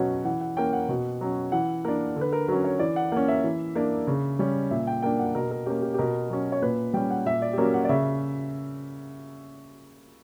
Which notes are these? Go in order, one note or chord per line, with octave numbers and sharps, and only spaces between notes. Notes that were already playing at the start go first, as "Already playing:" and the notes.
Already playing: B2 F#3 C#4 B4 C#5 F#5
E3 F#5
F#5
A#3 C#4 G5
F#5
B2
F#3 C#4
E3 F#5
A#3 D4 A#4
D3
B4
A#4
F#3 C#4 A#4
C#5
E3 D5
F#5
A#3 C#4 F#5
E5
E3
A#3 D4
C#3
G3 C#4
A#2 E5
G5
A#3 D4 G5
F#5
B2 A#4
A#4
A#3 C#4 G4
G4
G4
B2 A#4
F#3 C#4
C#5
A#2 B4
G3 C#4 G5
F#5
A#2 E5
D5
G4
F#3 A#3 C#4 A#4
F#5
D5
C#3 E5